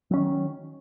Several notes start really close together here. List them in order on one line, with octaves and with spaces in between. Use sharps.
F#3 C#4 D#3